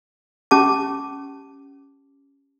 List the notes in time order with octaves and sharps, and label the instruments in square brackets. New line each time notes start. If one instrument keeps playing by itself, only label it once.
[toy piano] C#4 G4 A5 D6